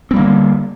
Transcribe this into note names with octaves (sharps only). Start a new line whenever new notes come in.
D3 G3 A#3 C4